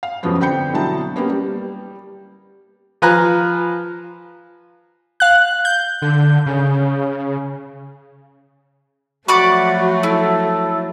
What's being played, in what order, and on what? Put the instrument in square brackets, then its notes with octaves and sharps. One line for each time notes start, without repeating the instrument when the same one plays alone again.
[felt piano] F5
F2 C3 F3 F#3 B3 C#4
D3 C4 G5 B5 G6 C#7
B2 D3 F#3 E4 A5 A#5
A#3 B3 C#4 G4
G3
[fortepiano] F3 F4 B4 G#5 A#5 F#6
[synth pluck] F5 F#6
G6
[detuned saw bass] D3
C#3
[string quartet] F3 F#3 A3 [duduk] F#4 [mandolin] D5 B5 C#6
[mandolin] E4 [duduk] A4